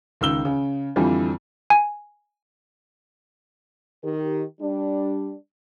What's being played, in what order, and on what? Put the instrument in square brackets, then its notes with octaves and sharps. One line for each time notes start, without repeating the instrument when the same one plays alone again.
[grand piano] C#2 D#3 E6 G7
C#3
F2 D3 E3 F3 G3
[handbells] G#5
[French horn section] D#3 G4 A#4
G3 D4